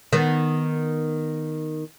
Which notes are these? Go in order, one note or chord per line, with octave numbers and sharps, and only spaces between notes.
D#3 B3